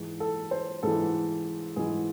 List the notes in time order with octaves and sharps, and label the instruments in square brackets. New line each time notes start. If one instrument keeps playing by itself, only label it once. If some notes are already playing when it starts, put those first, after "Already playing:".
Already playing: [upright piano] G#2 E3
A4
C5
G#2 E3 A4
G#2 E3 G#4